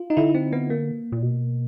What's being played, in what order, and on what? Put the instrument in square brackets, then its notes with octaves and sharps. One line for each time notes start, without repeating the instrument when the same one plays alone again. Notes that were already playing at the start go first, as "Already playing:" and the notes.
Already playing: [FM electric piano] F4
D#4
[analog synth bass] D3 [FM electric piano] E4
[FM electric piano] C4
B3
A#3
[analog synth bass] A#2
B2